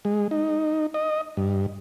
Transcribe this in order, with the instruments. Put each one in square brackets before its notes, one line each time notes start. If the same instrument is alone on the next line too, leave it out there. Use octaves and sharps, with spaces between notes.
[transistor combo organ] G#3
D#4
D#5
G2